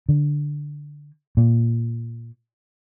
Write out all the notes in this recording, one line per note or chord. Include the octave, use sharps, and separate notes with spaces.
D3
A#2